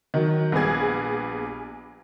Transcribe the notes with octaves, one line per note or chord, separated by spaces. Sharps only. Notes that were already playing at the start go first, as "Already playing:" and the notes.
D#3 F#3
A#1 G3 B3 G#4 G#6